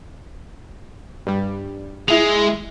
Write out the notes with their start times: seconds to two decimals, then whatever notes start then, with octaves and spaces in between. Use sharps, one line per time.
1.27 G2 G3
2.08 G#3 E4 F7